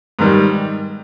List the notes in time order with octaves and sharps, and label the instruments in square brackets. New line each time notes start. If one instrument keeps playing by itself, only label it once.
[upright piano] G#2 D#3 G3